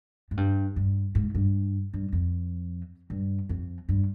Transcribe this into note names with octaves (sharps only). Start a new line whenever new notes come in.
G#2
G2
G2
G#2
G2
G2
F2
G2
F2
G2